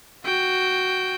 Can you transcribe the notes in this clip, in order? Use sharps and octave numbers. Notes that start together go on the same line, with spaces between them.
F#4 G5